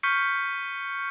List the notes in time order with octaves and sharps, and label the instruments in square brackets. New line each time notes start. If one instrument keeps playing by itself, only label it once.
[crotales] C#6 F6 G6 B6 C#7